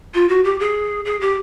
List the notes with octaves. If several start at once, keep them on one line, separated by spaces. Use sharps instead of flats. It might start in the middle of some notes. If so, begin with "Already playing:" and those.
F4
F#4
G4
G#4
G#4
G4